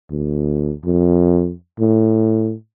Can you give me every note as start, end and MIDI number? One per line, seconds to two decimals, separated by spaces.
0.11 0.73 38
0.85 1.52 41
1.80 2.53 45